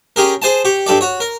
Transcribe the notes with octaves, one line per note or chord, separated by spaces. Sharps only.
C#4 G4 G#4 A#4
G#4 C5 G#5 A5
G4 C#6
G2 G3 A4 D5
F#4 C#5
A#4